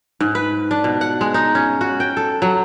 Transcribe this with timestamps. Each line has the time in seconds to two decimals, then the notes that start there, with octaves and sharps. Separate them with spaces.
0.20 G#2
0.35 B4
0.71 D4
0.84 B2
1.01 F#5
1.21 G#3
1.34 D#4
1.55 C#4
1.81 F#4
2.00 G5
2.17 A4
2.42 F#3